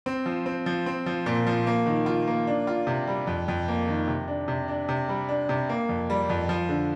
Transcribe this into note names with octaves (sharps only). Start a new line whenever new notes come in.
C4
F3
C4
F3
C4
F3
A#2
F3
A#3
D#3
F4
A#3
D4
F4
C3
G3
F2
F2
A#3
D#3
C3
D4
C3
D4
C3
G3
D4
C3
A#3
F2
G3
F2
F3
D3